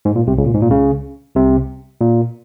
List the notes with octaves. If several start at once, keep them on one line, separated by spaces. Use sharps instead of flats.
G#2
A#2
C2 C3
C#2 C#3
A#2
G#2
A#2
C#2 C#3
C2 C3
A#2